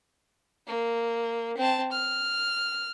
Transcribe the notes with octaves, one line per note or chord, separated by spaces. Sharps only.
A#3
C4 A5
F6